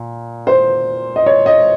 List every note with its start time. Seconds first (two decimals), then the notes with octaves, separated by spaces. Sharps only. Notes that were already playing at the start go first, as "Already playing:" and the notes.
Already playing: A#2
0.47 C5
1.16 D#5
1.26 C#5
1.46 D#5